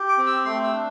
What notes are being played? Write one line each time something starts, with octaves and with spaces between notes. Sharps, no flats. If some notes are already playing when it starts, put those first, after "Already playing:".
Already playing: G4
D6
C4
E6
A3 C6
E6
D4